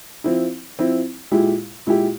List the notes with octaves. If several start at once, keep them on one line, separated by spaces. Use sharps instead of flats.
F3 C4 E4
F3 C4 E4
A#2 G#3 E4 G4
A#2 G#3 E4 G4